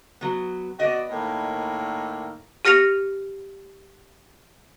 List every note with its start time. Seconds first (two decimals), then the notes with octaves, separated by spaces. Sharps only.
0.21 F#3 B3
0.80 B3 F#4 D5 D#5
1.11 A2 D#3 A#3
2.65 G4 F6 A#6 C#7 F7